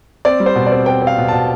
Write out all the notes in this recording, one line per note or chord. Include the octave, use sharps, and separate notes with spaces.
C4 D5
G3
C5
B2
D5
C4
C4 G5
C4
F5
B2
B2 A5